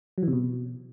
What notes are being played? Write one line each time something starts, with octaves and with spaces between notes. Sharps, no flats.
F#3
E3
C3
B2